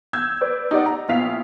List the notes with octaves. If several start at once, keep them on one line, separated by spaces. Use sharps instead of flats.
E6 G6 G#6
B4 D5
D#4 G4 D5 F#5
A#5
A#1 B3 E4 F5 B6 F7